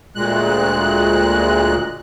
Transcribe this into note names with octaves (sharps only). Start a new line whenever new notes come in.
D2 A#2 G#3 F#6